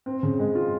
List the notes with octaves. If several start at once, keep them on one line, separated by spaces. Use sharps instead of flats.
C4
C#3
G#3
F4